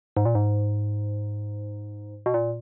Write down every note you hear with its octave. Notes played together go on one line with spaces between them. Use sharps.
G#2
A#2
G#2
B2
A#2